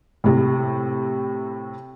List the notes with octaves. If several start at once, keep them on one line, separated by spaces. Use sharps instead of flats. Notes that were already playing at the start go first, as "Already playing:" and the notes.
A2 C3